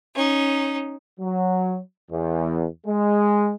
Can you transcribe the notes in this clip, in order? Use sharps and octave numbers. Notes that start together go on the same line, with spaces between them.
C#4 D#4
F#3
E2
G#3